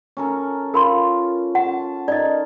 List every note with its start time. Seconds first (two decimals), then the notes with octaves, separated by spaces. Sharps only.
0.17 C#4 A4 A#4
0.74 F4 A#4 B5 C6
1.55 F#5 A5
2.08 D#4 A4 A#4 D5 D#5